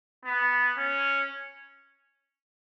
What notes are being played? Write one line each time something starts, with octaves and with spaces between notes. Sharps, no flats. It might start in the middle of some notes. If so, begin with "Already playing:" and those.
B3
C#4